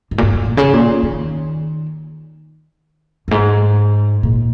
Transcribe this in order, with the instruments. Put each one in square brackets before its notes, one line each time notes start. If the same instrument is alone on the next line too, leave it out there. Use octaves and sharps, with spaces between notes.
[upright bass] G#2
A#2
G#2
G#2
A#2
C#3
A#2
D#3
F#2
G#2
A#2